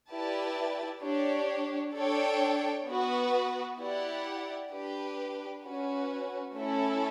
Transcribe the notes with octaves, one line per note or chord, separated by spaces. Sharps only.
E4 G4 B4 D5 A5
D4 G4 C#5
D4 A4 C#5 G5
B3 F#4 B4
E4 G4 D5 F#5
D4 G4 B4
C#4 F#4 B4
A3 C#4 E4 A4 E5